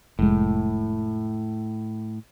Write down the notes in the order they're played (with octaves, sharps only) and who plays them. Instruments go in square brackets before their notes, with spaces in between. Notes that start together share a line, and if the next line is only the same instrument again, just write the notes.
[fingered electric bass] F1 G#3 [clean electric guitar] A2